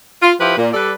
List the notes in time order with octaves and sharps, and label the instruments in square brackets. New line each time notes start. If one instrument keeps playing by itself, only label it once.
[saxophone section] F4
F3 E4 F4 G4 B4
A#2
G3 A4 B4 D5